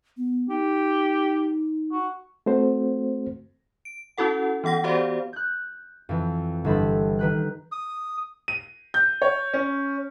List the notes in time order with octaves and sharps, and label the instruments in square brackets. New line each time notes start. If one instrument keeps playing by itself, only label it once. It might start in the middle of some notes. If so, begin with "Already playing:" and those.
[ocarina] B3
[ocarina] D#4 [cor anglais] G4
[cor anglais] F#4
[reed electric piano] A3 C4 F#4 C5
[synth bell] D7
C#4 E4 F#4 A4 F#5
E3 B3 F#5 A#6
B3 F#4 G4 C5 D5 F5
[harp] F#6 G6
F2 E3
G1 E3 A4 B5
D#3 B4 F#6
[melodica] D#6
[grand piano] D#7
G6
C#5
C#4